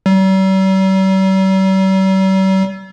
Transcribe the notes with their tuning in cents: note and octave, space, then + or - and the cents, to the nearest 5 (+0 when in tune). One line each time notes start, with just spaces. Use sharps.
G3 -45